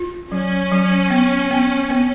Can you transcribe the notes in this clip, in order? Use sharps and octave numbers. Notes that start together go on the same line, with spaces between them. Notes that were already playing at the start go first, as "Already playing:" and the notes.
Already playing: F4
F#3 C#4
F#3
B3
B3
B3